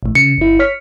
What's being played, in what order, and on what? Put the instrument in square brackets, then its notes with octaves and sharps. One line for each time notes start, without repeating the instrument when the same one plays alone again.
[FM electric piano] A1 A2
[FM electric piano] C#3 [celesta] C#7
[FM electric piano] G1 E4
C#5 F6 B6